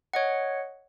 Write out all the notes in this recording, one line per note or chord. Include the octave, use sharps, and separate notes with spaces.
C#5 D#5 F#5